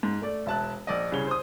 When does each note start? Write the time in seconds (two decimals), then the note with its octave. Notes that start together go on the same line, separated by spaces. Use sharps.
0.03 G#2
0.22 A3 D5
0.46 E1 E5 A5 F#6
0.87 A#1 D5 D#5
1.12 C2 C#3 C#5 G7
1.27 C5 D#6